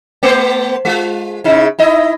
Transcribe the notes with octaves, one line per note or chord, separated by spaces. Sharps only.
A3 B3 C5
G#3 F4
C#3 D#4 E4
D#4 E4 D#5